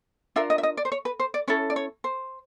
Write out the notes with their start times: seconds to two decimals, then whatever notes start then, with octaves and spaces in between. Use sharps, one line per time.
0.36 D4 F4 A#4 E5
0.50 D#5
0.58 E5
0.63 D#5
0.77 D5
0.85 C5
0.92 C#5
1.05 B4
1.20 C5
1.34 D5
1.48 C#4 E4 A4 C#5
1.70 D5
1.76 C#5
2.04 C5